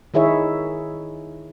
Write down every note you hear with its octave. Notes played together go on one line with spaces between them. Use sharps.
D#3 D#4 E4 G#4 C#5 E5